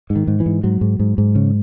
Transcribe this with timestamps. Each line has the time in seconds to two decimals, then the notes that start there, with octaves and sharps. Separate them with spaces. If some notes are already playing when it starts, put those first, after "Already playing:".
0.10 G#2
0.16 D#3
0.27 G#2
0.40 E3
0.46 G#2
0.63 G#2 F#3
0.81 G#2
0.99 G#2
1.18 G#2
1.35 C#3